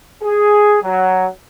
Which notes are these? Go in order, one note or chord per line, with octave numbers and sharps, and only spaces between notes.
G#4
F#3